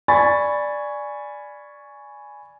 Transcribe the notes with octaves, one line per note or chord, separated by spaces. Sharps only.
D5 G#5 B5 C#6 A6